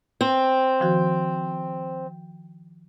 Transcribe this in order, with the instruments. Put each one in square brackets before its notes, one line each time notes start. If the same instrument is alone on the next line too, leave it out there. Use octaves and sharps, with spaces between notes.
[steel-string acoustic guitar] C4
[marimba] D#3 F3 F#4